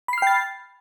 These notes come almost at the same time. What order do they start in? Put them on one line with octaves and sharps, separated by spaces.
B5 C7 F6 G5 A6